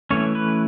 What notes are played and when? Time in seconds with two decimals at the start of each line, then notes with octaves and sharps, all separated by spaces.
0.11 E3 A3 C#4 C#5
0.35 B4